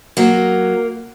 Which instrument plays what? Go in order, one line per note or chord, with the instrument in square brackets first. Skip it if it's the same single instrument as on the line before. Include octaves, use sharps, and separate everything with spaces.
[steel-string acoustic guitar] F#3 A#3